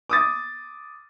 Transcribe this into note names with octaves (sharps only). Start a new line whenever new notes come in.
D6 D#6 A6